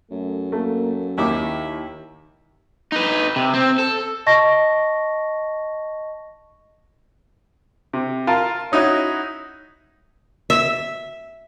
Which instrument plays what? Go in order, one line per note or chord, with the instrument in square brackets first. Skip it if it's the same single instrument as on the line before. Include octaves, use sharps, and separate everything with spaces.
[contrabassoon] F#2 [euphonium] A3
[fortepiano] A3 [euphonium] A#3
[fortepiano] D#2 D6 [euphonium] D#3 [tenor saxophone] E4
[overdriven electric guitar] D#4 B4
C3
C4
A4
[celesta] D#5 A5 C#6 A#6
[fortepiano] C3
F4 A#4 A5 C6
C#4 D#4 E4 F#4 C#5
[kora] E5